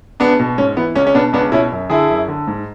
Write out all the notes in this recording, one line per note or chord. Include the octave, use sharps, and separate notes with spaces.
C#2 B3 D4
B2
G#2 C#4
E3 B3
C#2 C#4
C#4
B2 B3 D4
C#2 B3 D4
B2 C#4 E4
F#2
D3 E4 G#4
F#2
D3
G#2